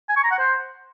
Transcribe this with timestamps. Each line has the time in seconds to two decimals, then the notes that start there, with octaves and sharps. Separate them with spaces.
0.09 G#5
0.16 C#6
0.24 A#5
0.31 F#5
0.38 C5